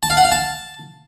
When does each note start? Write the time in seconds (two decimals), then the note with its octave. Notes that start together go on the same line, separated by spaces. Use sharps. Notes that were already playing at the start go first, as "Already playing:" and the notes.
0.03 A5
0.10 F5
0.17 F#5
0.24 F5
0.32 A5